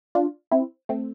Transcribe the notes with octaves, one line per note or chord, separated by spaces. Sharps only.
D4 F4
C4 E4
A3 C4